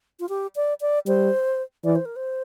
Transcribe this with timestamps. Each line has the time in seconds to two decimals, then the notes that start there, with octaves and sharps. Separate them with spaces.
0.20 F4
0.29 G4
0.56 D5
0.81 D5
1.06 G3 C5
1.84 E3 D5
1.95 C5
2.05 A#4
2.16 C5